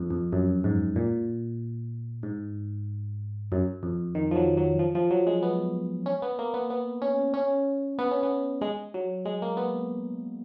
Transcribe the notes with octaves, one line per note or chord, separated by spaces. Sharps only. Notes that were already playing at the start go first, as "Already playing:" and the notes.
Already playing: F2
F2
F#2
G#2
A#2
G#2
F#2
F2
D#3
F3
F#3
F#3
F3
F3
F#3
G#3
B3
C#4
B3
A#3
B3
B3
C#4
C#4
B3
C#4
B3
G#3
F#3
G#3
A#3
B3